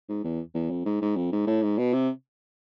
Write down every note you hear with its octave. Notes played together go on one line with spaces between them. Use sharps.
G#2
E2
E2
F2
G#2
G#2
F2
G#2
A2
G#2
B2
C3